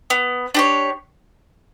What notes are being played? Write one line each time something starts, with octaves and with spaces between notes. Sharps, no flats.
B3
D4 G4 C#5